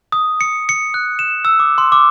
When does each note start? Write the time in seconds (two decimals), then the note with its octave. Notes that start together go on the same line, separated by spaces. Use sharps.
0.12 D#6
0.41 C#7
0.69 C#7
0.94 F#6
1.19 E7
1.45 E6
1.60 D6
1.78 C6
1.92 D6